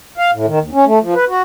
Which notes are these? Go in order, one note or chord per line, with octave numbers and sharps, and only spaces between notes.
F5
A2
D#3
D#2
C#4
A3
F3
B4
F#4